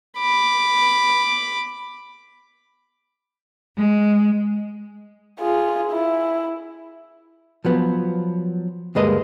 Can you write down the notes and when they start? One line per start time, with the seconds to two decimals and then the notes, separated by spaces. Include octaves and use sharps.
0.19 B5 D6
3.77 G#3
5.40 F4 G#4
5.91 E4
7.65 F3 F#3 B3
8.95 D2 G2 G#3 A#3 B4 D#5